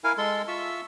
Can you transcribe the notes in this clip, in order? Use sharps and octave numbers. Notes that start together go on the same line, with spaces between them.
E4 A#4 F5 G#5
G#3 A4 C6
F4 E5 C#6 E6